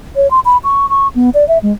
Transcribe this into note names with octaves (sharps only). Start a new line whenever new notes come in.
C#5
C6
B5
C#6
C#6
B3
D5
E5
G#3